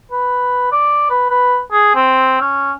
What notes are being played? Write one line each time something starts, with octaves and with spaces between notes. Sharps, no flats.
B4
D5
B4
B4
G#4
C4
C#4